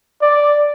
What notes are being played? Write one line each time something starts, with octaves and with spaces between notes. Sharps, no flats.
D5